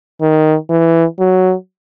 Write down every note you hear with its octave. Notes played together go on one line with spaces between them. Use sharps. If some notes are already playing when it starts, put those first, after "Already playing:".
D#3
E3
F#3